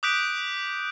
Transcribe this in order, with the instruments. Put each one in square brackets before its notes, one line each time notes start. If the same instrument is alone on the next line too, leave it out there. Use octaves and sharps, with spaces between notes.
[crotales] D6 D#6 F#6 G6 B6 D7